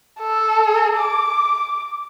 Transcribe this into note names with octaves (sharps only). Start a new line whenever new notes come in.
A4
D6